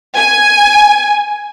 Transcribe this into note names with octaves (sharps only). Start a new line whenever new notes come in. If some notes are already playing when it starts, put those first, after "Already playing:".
G#5